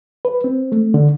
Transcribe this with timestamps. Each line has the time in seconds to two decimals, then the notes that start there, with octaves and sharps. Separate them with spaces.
0.25 B4
0.44 C4
0.72 A3
0.94 D3